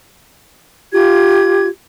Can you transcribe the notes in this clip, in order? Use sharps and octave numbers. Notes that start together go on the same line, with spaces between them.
F4 G4 G#6